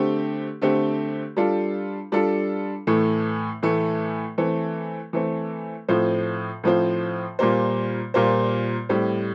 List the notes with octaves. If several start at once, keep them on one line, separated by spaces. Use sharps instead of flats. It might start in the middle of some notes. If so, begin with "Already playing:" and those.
Already playing: D3 A3 C4 G4
D3 A3 C4 G4
G3 D4 F4 A4
G3 D4 F4 A4
A2 E3 A3
A2 E3 A3
E3 A3 C4
E3 A3 C4
A2 F3 C4 F4 C5
A2 F3 C4 F4 C5
A#2 G3 A#3 F4 C5
A#2 G3 A#3 F4 C5
A2 G3 C4